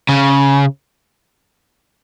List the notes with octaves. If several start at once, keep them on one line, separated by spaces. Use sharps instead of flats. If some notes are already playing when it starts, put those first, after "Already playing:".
C#3